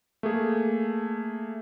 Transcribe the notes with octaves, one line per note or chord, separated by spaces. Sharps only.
A3 A#3 G#4